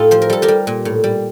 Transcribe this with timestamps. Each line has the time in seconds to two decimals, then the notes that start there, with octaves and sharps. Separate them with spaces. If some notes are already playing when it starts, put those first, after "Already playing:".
Already playing: A2 D#4 F4 G4 A4
0.11 F3 C5
0.22 A#4
0.30 G3 A4
0.42 G4 A#4
0.48 G3
0.67 A#2
0.85 A2
1.04 G3